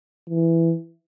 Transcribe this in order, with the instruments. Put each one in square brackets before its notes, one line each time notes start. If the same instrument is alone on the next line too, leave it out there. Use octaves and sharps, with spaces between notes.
[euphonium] E3